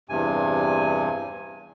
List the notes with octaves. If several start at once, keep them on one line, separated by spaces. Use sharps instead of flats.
E2 G2 C3 G#5